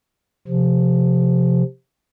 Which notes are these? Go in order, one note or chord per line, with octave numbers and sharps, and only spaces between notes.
C3 F3